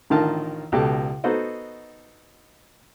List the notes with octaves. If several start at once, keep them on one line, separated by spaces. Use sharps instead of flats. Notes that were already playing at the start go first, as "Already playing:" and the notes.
A1 D3 D#3 F4 A#4 A5
C#2 B2 G4 A4 A5
B3 D#4 F#4 A4 C5 D#5